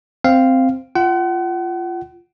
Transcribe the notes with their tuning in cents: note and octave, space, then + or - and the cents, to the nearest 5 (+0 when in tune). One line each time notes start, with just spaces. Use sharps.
C4 -5 F5 -5
F4 -15 F#5 +35